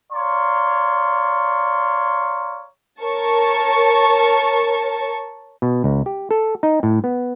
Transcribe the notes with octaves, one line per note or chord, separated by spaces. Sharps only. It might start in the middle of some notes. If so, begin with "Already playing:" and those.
C#5 D5 F5 A#5 C6
A#4 C#5 A5 C#6
B2
C#2
G4
A4
D#4
A2
B3